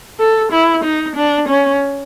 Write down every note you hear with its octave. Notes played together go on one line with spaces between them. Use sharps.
A4
E4
D#4
D4
C#4